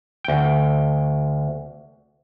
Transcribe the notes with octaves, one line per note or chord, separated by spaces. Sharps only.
D2 G5